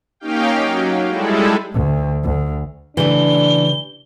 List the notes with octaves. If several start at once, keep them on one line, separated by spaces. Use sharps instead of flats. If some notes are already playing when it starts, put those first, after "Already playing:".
A#3 C#4 D#4 G4 F5 G5
F#3
G3 G#3 E4 G#4 A4
D2
D2
C#3 E3 A3 D4 G4 B4 G7